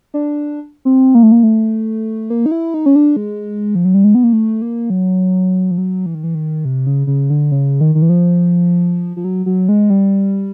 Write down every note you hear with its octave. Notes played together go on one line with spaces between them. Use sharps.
D4
C4
A#3
A3
A#3
A3
A#3
D#4
E4
D#4
C#4
D4
G#3
F3
F#3
G3
G#3
B3
A#3
A3
A#3
F#3
F3
F#3
E3
D#3
E3
D#3
C3
C#3
C#3
D3
C#3
D#3
D#3
E3
F3
F3
F#3
F#3
G#3
G3